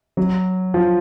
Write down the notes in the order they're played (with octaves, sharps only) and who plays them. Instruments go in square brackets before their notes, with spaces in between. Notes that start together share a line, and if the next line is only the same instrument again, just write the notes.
[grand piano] F#3
F3